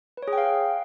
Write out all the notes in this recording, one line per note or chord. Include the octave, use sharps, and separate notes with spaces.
B4
C#5
G#4
G5
F5